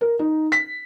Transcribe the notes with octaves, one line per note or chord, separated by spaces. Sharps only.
A#4
D#4
B6